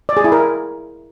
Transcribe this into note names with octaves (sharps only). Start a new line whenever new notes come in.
D5
G#4
E4
A#4